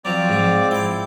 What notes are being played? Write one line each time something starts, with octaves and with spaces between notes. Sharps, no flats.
F3 F#3 C4 D5 D6
G#2 F3
E4 G5 D6